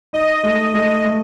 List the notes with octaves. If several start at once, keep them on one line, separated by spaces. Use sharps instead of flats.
D#4 D#5
A3 D#5
A3 D#5
A3